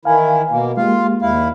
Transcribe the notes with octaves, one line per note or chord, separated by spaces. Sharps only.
D#3 E3 E4 F5 G#5
B2 A#3
G#3 A#3 F4 G4 F5
D#2 E4 F5